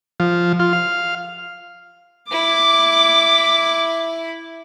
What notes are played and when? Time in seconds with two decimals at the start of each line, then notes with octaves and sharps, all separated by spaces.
0.20 F3
0.60 F4
0.73 F5
2.31 E4 D6